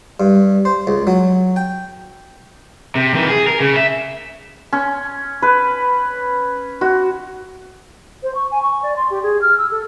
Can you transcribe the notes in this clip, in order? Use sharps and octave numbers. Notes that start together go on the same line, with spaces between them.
G2
C5
C#2
F#3
G5
C3
D#3 E3
G#4
A#4
C#3
E5
C#4
B4
F#4
C5
C#6
G#5
C#6
D5
C6
G4
G#4
F6
E6
A4